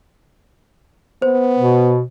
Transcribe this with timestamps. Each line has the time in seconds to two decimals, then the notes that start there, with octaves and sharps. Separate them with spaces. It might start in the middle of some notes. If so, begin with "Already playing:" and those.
1.22 B3 C5
1.58 B2